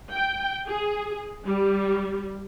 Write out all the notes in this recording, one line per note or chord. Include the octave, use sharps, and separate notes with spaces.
G5
G#4
G3